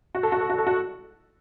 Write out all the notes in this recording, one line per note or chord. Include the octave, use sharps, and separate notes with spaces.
F#4
A4
F#4
A4
F#4
A4
F#4